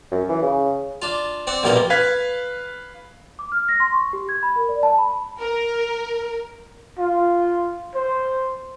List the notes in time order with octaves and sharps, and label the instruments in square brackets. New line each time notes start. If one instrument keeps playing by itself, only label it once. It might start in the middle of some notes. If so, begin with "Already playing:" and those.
[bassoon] F#2
E3
C#3
[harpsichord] D4 F4
C4 D5 F#5
A#1 G2 B2 F4 A#4 C6
[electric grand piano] B4 F5 G#6 B6
[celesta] D6
F6
A#6
C6
C#6
G4
G#6
B5
A#4
D5
A5
B5
[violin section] A#4
[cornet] F4
C5